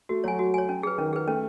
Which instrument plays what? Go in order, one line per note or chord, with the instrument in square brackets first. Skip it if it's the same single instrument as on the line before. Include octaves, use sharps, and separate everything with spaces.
[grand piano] A3 [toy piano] F#4
[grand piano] F#3 [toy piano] C#5 G#5
[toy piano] F#4
C#5 G#5
C#4
G#4 B4
[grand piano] D#3 [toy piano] C#4
[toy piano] G#4 B4
[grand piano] A3 [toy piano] C#4